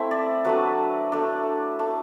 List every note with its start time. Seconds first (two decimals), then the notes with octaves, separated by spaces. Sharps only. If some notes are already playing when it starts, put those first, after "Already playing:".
Already playing: A3 C4 E4 E5
0.11 D5
0.45 F#3 A3 D4 B4
1.12 A3 D4
1.79 A3 D4